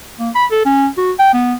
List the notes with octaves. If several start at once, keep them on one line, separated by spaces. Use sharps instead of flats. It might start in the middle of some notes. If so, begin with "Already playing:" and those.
A#3
B5
A4
C#4
F#4
G5
B3